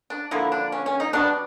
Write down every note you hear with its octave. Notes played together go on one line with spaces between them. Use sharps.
D4
D3 F3 A#3 E4
D4
C#4
C#4
D#4
B2 G3 B3 D4